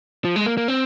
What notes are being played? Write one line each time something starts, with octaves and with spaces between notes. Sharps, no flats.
F3
G#3
A#3
A#3
C4